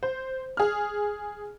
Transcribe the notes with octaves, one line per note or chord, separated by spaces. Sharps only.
C5
G#4 F6